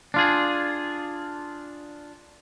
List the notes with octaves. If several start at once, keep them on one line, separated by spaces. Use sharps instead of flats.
D4 F4 G#4